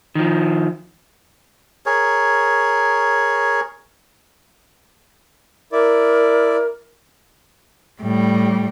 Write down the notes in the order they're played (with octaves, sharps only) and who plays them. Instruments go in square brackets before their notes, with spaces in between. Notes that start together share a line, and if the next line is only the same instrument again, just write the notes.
[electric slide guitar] D#3 F3
[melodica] G#4 A#4 C#5
[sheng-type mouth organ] E4 D5 [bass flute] A#4
[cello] A2 G3